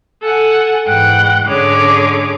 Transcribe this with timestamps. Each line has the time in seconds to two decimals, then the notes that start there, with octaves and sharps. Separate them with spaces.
0.23 A4 F#5 G#5
0.87 G#2 E3 F#5 G5
1.45 G#2 D3 C#4 G#4 C#5 D6